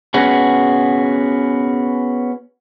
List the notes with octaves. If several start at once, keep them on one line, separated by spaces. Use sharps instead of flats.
B3 C#4 F#4 G#4